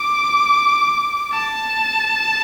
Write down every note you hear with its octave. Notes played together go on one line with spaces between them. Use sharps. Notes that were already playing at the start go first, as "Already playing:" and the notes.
Already playing: D6
A5